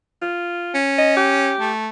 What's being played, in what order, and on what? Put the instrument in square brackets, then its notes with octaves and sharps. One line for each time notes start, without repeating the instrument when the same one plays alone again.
[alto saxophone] F4
[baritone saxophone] C#4
[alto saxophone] D#5
G4
[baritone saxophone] A3